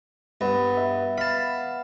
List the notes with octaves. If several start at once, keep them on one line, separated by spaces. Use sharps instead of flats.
G2 B3
B4 E5
F5 A5 B5